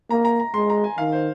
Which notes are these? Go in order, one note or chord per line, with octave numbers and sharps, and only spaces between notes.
A#3 A#5
A#5
A#5
G#3 C6
A#5
G#5
D#3 F5
C5